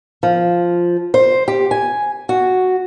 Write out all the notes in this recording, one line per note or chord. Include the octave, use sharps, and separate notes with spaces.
F3
C5
G4
G#5
F#4